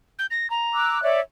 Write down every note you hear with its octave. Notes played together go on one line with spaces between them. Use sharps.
G6
A#6
A#5
D6 E6 F#6
C#5 D5 E5